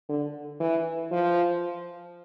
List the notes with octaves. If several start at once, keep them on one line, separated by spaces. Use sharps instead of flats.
D3
E3
F3